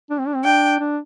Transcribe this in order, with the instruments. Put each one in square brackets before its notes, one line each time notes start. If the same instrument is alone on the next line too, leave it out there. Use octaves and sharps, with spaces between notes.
[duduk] D4
C4
D4
C4
[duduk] D4 [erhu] G5
[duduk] D4